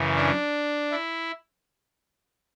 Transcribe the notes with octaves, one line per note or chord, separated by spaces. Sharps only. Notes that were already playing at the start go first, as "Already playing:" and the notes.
Already playing: F#2 C#3 E3
D4
E4